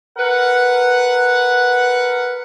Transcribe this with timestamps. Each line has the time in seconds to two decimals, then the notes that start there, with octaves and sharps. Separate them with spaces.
0.18 A#4 B4 F#5